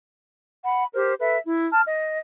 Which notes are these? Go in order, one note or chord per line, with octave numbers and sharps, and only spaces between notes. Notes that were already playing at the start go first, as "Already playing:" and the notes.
F#5 B5
G4 A#4 C5
A4 B4 E5
E4
A5 F6
D#5